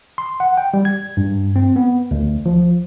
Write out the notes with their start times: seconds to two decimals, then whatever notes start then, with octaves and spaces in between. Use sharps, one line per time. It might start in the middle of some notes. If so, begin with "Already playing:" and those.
0.18 C6
0.40 F#5
0.58 G5
0.74 G3
0.85 G#6
1.17 G2
1.56 C4
1.76 B3
2.11 D2
2.46 F3